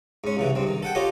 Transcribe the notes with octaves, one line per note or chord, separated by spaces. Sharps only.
G#2 C#4
C2 C#3 E3
G2 C4
D#3
A4 F#5 G5
F4 G4 A4 C#5 D#5 D6